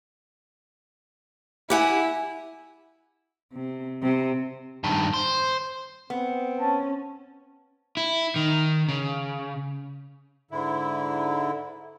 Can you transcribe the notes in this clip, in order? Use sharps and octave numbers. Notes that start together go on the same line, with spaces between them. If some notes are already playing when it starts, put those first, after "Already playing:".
E4 G4 F#5 G#5
C3
C3
G2 D#3
C5
B3 C4
C#4 A5
E4
D#3
C#3
G#2 D3 E4